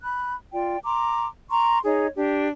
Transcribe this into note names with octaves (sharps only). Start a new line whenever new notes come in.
B5 F#6
F4 D5 G5
A#5 C6 D6
A#5 C6 C#6
D#4 G#4 C#5 D#5
D4 G4